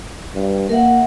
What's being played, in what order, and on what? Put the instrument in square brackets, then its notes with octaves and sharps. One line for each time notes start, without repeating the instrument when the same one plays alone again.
[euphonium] G2
[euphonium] A#3 [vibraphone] A#4 E5 F#5